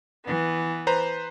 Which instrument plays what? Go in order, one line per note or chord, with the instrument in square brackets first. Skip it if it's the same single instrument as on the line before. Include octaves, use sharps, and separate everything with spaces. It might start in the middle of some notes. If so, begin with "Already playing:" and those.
[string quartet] E3 B3
[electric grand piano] B4 C5 A#5